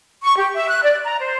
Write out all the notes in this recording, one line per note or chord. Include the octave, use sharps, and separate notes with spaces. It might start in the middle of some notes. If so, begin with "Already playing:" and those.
C#6
G4
E5
F#6
D5
A#5
C5